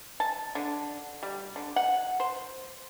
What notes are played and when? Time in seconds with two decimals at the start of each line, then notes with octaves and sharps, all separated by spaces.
0.20 A5
0.55 D3
1.23 G3
1.56 D3
1.76 F#5
2.20 C5